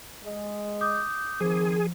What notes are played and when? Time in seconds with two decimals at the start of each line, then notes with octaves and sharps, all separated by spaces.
0.24 G#3 D#5
0.81 D6 D#6 G6
1.41 D#3 F3 C4 G#4